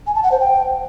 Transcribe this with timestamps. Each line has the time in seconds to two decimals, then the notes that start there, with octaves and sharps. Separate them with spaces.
0.07 G#5
0.15 A5
0.23 F#5
0.32 C5
0.40 G5